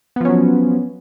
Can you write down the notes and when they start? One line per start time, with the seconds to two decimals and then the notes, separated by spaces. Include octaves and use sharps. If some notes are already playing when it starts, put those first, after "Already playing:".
0.16 B3
0.21 F3
0.25 C#4
0.29 F#3